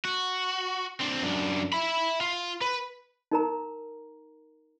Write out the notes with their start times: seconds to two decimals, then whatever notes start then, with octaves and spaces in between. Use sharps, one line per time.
0.05 F#4
1.00 C4 D4
1.22 F#2 D4
1.72 E5 B5
2.21 F4
2.61 B4
3.32 D#4 A#4 A#5